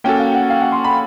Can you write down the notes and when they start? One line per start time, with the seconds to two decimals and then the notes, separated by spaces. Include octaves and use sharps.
0.04 A#3 C#4 F#4 A4 G5
0.19 F5
0.35 F#5
0.50 F5
0.61 F#5
0.72 C6
0.84 B5